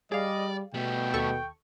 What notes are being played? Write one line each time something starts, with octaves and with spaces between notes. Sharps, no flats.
G3 G#4 D5 D#5 F5
B2 G3 A3 G5
D#2 A4 C#6